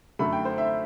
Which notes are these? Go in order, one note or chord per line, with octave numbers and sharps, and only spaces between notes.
F#2 D3 A3 B5
G5
C5
E5